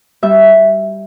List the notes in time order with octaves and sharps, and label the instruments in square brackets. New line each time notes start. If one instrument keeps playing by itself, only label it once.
[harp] G3 E5